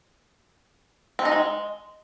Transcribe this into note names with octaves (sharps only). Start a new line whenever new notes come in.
C4
D#4
G#3